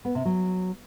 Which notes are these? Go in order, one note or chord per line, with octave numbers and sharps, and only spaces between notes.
B3
C3
F#3